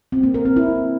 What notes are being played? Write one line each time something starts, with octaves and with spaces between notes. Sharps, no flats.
C4
A#3
A#4
C4
E4